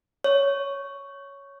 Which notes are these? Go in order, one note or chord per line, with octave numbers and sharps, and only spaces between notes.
C#5